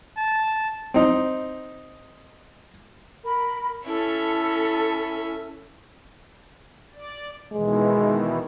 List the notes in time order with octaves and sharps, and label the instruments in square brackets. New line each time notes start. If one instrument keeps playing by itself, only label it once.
[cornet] A5
[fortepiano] C4 D#4
[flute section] A#4 B5
[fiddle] C#4 E5 [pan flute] E4 [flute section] A4
[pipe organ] D5
[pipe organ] B2 D#3 E3 [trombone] G#3